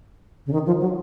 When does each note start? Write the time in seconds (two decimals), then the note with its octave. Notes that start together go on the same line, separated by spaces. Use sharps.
0.46 C#3
0.53 D#3
0.66 F3
0.81 F#3